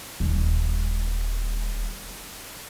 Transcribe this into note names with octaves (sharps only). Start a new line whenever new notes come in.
D#1 G3